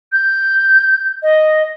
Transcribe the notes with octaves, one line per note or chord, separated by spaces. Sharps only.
G6
D#5